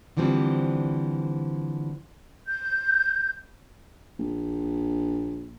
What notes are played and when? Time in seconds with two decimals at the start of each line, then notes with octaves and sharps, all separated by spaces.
0.17 D3 E3 F3 G3 C4
2.48 G6
4.19 A#1